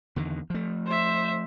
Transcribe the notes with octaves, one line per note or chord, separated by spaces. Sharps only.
E2 D3 D#3
F3 A3
C5 E5